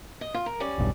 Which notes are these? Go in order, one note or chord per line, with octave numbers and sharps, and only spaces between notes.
D#5
F4
A#4
G3 C#4 D5
E1 B1 G2